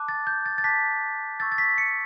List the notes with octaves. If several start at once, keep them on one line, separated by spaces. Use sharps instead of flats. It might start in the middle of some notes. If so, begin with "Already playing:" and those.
Already playing: A5 D6 F#6
A6
G6
A6
A6
A5 D6 F#6 B6
C#6 E6 G6 A6
A6
B6
C#7